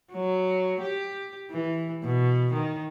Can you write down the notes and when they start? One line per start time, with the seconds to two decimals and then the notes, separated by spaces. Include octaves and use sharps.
0.13 F#3
0.82 G4
1.51 E3
2.04 B2
2.54 D#3